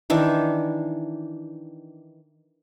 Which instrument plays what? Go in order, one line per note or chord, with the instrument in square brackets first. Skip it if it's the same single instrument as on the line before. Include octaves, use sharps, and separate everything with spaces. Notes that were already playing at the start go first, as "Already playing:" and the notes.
[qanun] D#3 E3 D4